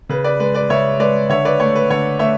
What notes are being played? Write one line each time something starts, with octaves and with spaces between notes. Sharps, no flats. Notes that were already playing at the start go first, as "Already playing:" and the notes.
C#3 B4
B4 D5
G#3 B4
B4 D5
C#3 C#5 E5
G#3 B4 D5
D3 C#5 E5
B4 D5
A3 C#5
B4
D3 C#5
A3 C#5 E5